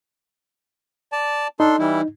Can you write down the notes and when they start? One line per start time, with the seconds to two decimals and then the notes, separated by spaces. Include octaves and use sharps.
1.12 D5 A5
1.60 D4 D#4 A4 C6
1.80 E3 G3 E4